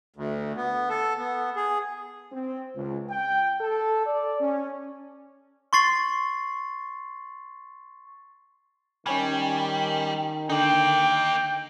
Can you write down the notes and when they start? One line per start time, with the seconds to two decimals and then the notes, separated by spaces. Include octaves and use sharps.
0.16 D2
0.57 B3
0.89 A4
1.18 B3
1.56 G#4
2.31 C4
2.75 C#2
3.10 G5
3.61 A4
4.06 D5
4.41 C#4
5.73 C6 C#6 A6 C7 F#7
9.06 D#3 G3 C#4 C#5 G#5
10.50 D3 A#3 D#4 G5